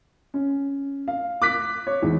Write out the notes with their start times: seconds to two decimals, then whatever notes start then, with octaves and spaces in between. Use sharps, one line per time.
0.34 C#4
1.08 F5
1.42 D6 F#6 B6
1.87 C#5
2.02 E2 G#2